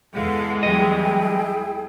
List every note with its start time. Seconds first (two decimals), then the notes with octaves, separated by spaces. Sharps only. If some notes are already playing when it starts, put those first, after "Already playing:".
0.14 E2 E3 G#3 A4 F5 F#5
0.63 F#3 G3 E4 G#4 D#5 G5